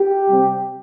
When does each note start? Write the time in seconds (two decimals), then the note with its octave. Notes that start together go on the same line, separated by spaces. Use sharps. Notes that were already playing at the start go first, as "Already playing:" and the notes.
Already playing: G4
0.27 C3 G3 C4